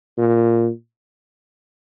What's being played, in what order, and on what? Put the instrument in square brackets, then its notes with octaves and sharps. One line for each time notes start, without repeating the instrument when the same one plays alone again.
[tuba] A#2